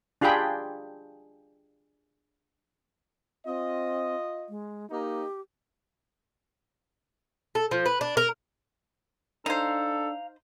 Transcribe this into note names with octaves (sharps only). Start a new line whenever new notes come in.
D4 F4 G4 G#4 G5 B5
C4 F4 D#5
G#3
A#3 D#4 G4
A4
F3
B4
D4
A#4
D4 D#4 A4 C5 F5 A#5